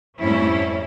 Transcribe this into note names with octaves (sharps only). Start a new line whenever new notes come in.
F2 G#2 G3 A3 C#4 E4